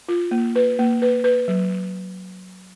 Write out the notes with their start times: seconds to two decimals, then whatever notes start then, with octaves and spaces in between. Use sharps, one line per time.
0.09 F4
0.31 A#3
0.56 B4
0.79 A#3
1.02 B4
1.24 B4
1.48 F#3